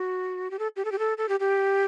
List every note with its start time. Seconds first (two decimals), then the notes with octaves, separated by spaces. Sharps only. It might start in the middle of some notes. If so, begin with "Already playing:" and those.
Already playing: F#4
0.51 G4
0.59 A4
0.76 G4
0.85 A4
0.92 G4
0.99 A4
1.18 A4
1.29 G4
1.40 G4